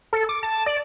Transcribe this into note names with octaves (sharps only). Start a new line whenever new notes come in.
A4
D6
A5
D5